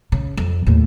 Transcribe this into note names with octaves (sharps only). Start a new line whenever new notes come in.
C#3
F2
D#2 A2